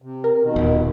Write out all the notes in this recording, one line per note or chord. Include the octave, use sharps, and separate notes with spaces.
C3
A#4
B2 D#3
D#1